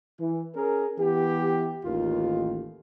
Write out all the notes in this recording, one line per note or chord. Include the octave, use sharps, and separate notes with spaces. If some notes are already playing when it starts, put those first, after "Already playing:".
E3
C#4 G#4 A#4
E3 B3 G4
A1 D#2 D#3 F4